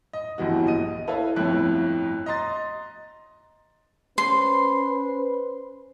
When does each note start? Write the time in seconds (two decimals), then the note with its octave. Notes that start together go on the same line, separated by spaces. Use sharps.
0.13 D#5
0.38 G1 F2 E3 F#4
0.66 A#1 D#5 D#7
1.08 E4 A4 B4 C#5 E5 F5
1.36 G1 F2 A2 E4 C#5 F#6
2.26 D#5 A#5 C6 A6
4.18 C#4 B4 C5 C6